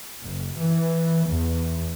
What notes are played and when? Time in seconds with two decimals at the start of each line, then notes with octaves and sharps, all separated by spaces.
0.24 F#1
0.57 E3
1.28 E2